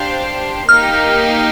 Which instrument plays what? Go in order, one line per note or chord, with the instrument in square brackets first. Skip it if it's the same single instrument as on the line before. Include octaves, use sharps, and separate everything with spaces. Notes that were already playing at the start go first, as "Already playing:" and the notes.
Already playing: [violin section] D4 G4 C5 F5
[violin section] A#3 D#4 G4 [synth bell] F6